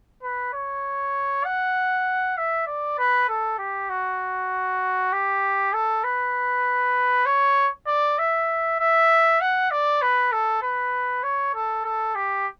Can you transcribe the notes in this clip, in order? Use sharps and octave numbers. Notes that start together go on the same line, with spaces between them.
B4
C#5
F#5
E5
D5
B4
A4
G4
F#4
G4
A4
B4
C#5
D5
E5
E5
F#5
D5
B4
A4
B4
C#5
A4
A4
G4